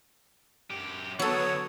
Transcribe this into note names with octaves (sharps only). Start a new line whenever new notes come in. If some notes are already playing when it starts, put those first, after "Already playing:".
F#2 G4
D3 F#3 B3 F#4 A4 C#5 D#6 E6